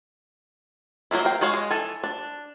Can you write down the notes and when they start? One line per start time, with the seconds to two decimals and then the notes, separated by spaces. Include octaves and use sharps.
1.11 F#3 G#3 A#3 E4
1.24 A#4 F5 G5
1.41 G#3 F#4 C#5 F5
1.54 G#3
1.71 E3 A4 G#5
2.04 D4